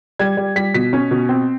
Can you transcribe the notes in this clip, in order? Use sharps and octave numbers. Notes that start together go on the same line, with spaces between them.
G3 G#6
G3
G3 B6
B2 B6
C#4
B2
C4